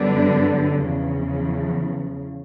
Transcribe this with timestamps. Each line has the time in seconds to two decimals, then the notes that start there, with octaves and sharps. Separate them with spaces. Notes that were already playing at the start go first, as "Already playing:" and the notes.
Already playing: F#2 D3 G3 B3 D4
0.85 E2 C#3 F3